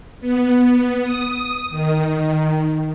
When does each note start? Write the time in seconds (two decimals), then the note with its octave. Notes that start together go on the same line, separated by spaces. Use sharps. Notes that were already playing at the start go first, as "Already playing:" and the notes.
0.20 B3
1.00 D#6
1.70 D#3